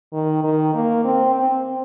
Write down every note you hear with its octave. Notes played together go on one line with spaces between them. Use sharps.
D#3
D#3
A#3
C4
C4